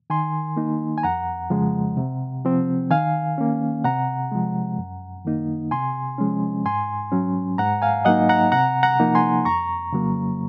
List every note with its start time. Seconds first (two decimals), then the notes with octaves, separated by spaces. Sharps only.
0.10 D#3 G#5 C6
0.57 A#3 D#4
0.98 G#5
1.03 F2 F#5 A#5
1.50 C#3 F3 G#3
1.97 C3
2.45 F3 C4
2.90 D#3 F5 G#5
3.38 A#3 C#4
3.84 C3 F#5 A#5
4.32 F3 G#3
4.78 F#2
5.25 D#3 A#3 D#4
5.71 C3 G#5 C6
6.18 F3 G#3 C#4
6.65 G#2 G#5 C6
7.12 F#3 C#4
7.58 G#2 F#5 A#5
7.82 F5 G#5
8.05 F#3 A#3 D#4 D#5 F#5
8.29 F#5 A#5
8.52 C3 F#5 A#5
8.83 F#5 A#5
9.00 F3 A#3 D#4
9.15 G#5 C6
9.45 F2 A#5 C#6
9.93 C#3 F#3 A#3